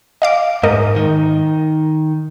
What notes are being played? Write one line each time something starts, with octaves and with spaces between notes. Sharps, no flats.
D#5 F5 D6
G#2 A#4 D#5
D#3